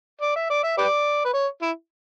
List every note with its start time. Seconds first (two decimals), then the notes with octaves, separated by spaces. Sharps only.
0.22 D5
0.36 E5
0.50 D5
0.64 E5
0.78 G4 B4 D5
1.25 B4
1.34 C#5
1.62 E4